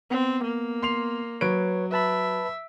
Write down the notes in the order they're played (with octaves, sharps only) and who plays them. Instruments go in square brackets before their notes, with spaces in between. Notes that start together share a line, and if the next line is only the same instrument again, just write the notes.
[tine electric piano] B3 [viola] C4
[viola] A#3
[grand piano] C6 C7 F7
[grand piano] F#3 D7 [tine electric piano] B4 C#5
[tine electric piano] B4 A5 B5 [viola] E5